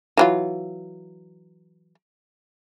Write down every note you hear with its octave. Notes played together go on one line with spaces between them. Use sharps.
E3 F#3 F4